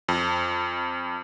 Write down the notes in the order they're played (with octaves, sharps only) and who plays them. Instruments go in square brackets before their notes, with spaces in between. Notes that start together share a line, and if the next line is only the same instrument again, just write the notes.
[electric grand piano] F2